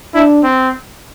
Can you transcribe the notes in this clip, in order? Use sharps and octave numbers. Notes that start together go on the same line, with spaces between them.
D4 E4
C4